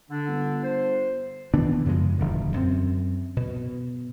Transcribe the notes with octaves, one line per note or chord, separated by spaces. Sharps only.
D3 D4
G1
C5
D#3 E3 B3 D4
F#2 C#3 F3 G#3
D#1 E2 G2 D3
F#2 C4
B2